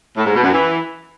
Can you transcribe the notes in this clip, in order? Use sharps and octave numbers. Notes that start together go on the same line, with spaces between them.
A2
G#2
B2
F#2
E3